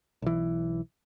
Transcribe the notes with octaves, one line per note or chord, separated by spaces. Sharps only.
B1 E3